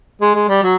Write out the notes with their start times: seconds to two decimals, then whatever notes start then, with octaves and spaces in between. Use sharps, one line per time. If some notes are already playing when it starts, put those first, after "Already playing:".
0.21 G#3
0.35 G#3
0.49 G3
0.63 F#3